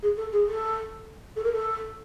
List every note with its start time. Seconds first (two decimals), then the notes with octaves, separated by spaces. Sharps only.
0.03 G#4
0.17 A4
0.33 G#4
0.48 A4
1.36 A4
1.44 A#4
1.52 A4